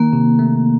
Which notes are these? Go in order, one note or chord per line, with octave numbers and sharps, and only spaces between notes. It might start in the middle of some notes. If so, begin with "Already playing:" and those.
Already playing: D#3 A#3
C3
A3